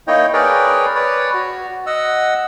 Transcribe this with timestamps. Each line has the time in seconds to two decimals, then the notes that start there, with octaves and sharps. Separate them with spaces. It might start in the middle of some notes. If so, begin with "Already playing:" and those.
0.07 A#3 D#4 E4 C#5 D#5 G5
0.33 G#4 A#4 B4 C#5 D5 G5
0.95 B4 C#5 D5
1.34 F#4
1.86 D#5 F#5 E6